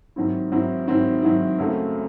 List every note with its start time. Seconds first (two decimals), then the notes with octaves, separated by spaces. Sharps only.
0.16 G#2 D#3 F#3 C4 E4
0.52 G#2 D#3 F#3 C4 E4
0.87 G#2 D#3 F#3 C4 E4
1.23 G#2 D#3 F#3 C4 E4
1.59 F#2 C#3 F#3 A3 C4